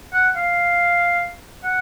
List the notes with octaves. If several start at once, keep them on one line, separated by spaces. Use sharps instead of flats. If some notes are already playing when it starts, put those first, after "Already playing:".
F#5
F5
F#5